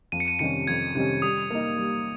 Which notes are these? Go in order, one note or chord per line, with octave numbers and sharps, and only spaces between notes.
F2 D#7
C#7
D#7
C3 D#3 G3 C#4 C#7
F2 G#6
C3 D#3 G3 C#4
G3 D#6
A#3 D#4
G3